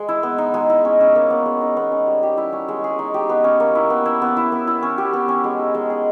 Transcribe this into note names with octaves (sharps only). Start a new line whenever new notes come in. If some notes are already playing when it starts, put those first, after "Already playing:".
Already playing: G#3
E4
B3
D#4
G#3
E4
C#4
C#4
A#3
B3
G#3
D#4
B3
C#4
G3
G4
E4
C#4
G#3
G#4
D#4
G4
B3
C#4
A#3
E4
B3
E4
B3
E4
B3
E4
C#4
G4
B3
C#4
G#3
D#4
G#3
G#4